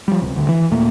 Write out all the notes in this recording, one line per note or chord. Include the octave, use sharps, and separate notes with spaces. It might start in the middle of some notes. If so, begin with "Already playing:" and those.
F3 G3
C#2 C3
D1 D2 D3
E3
D#2 A#2 A3 A#3